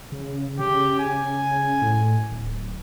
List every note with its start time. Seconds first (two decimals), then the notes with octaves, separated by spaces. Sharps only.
0.12 C#3
0.59 C#3 G4
0.99 G#5
1.82 A2
2.32 D1